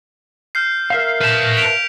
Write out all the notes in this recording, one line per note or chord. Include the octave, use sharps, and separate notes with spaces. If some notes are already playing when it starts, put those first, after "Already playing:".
F6 G6 C7
A#4 E5 F5
B4 A5 G6 B6
B6 D7 F7